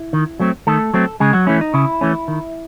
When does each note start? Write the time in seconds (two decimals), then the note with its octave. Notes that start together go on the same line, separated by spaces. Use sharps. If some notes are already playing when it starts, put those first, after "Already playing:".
Already playing: E4
0.13 D#3
0.40 F#3 A3 C4
0.67 D#3 A3 A4
0.94 F#3 A3 C4
1.20 C#3 G#3 G#4
1.33 F#3 F#4
1.47 E3 A3 C#4 E4
1.61 D#4
1.74 C#3 E4
2.01 E3 A3 C#4
2.28 D#3